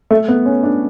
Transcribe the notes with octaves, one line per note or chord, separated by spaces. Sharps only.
A3
B3
C#4
D4